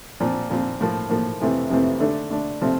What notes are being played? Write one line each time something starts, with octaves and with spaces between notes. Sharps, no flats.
A#2 F3 C4
A#2 F3 C4
A2 F3 A#3
A2 F3 A#3
F2 C3 E3 A3 C4
F2 C3 E3 A3 C4
D3 A3 D4
D3 A3 D4
C3 F3 A3 C4